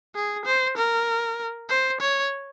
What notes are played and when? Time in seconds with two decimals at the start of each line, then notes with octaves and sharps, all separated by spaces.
0.15 G#4
0.46 C5
0.77 A#4
1.69 C5
2.01 C#5